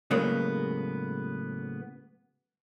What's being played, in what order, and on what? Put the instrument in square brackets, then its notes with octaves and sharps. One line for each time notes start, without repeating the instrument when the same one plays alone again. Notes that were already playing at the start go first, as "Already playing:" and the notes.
[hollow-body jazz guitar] A2 C#3 F#3 G#3 A#3 B3